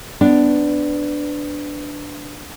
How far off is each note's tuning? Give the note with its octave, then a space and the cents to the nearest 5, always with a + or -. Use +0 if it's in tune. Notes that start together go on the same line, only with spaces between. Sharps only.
B3 +25 D4 +0